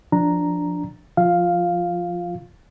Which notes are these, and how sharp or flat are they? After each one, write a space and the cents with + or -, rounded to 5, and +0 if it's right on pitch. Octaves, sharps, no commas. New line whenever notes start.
F3 +0 D4 +0 A#5 +0
F3 +0 F4 +0 F5 +5